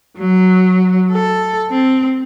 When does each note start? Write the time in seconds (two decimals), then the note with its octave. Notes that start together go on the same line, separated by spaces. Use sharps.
0.17 F#3
1.11 A4
1.71 C4